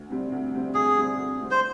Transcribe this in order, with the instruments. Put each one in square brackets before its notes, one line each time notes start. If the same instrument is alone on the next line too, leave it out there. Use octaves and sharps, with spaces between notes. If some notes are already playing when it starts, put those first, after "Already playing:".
Already playing: [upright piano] D2
C3 G3 C4
D2
C3 G3 C4
[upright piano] D2 [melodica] G#4
[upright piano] C3 G3 C4
D2
C3 G3 C4
[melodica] C5